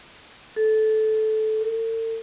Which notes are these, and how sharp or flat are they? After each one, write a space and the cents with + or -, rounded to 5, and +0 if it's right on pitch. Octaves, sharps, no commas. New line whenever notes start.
A4 -15
A4 +45